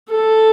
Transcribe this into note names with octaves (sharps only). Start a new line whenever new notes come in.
A4